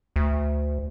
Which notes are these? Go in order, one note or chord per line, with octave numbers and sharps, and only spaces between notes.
D2